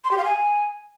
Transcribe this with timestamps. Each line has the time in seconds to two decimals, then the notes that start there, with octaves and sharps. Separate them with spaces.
0.04 C6
0.11 G4
0.18 F5
0.25 G#5